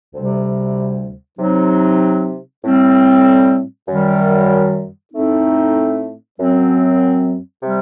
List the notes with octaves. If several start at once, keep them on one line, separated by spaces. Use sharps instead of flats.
D2 C3 G3 C4
C3 F#3 C4 D#4
A2 G3 C4
F#2 D#3 G3
A2 A3 C4 D#4
F#2 F#3 C4
C3 G3